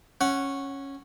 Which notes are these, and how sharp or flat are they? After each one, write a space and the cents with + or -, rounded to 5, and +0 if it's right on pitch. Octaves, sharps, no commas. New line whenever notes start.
C#4 -10 F#5 +0